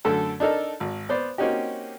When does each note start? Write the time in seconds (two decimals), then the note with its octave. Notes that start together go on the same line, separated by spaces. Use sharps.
0.05 F#2 D3 A3 A4 A5
0.40 D4 D#4 A4 A#4
0.80 G#1
1.09 B3 C5 D5
1.38 A#3 C4 C#4 D#4 F#4 G4